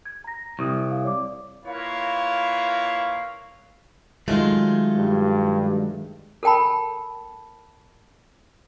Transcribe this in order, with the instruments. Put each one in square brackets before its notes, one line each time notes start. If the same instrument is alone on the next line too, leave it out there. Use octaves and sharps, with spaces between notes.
[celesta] G#6
A#5 A#6
[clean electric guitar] C2 [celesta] C#6 D#6
[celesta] F5
C#5 D5 D6
[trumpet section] A#3 E4 F4 B4 C#5 F5
[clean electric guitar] D#3 F#3 A3 [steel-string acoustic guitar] G#3 F4
[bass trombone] G2
[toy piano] A4 A#4 G5 A5 B5